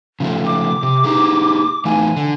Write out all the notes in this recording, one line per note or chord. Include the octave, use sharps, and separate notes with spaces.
C#3 F3 A3
D6
C3
D#4 G4 G#4
E3 A3 D#4 G#5
D3